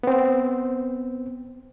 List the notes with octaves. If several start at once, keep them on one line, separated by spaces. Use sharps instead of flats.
B3 C4